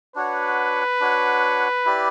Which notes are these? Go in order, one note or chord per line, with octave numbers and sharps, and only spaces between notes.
D4 F#4 B4 C#5 F#5
D4 F#4 C#5 F#5
E4 G4 D5